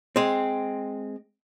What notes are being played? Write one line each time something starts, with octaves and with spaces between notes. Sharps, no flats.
G#3 C4